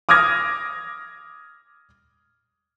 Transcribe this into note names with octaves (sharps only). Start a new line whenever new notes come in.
D6 D#6 F6 G#6 A#6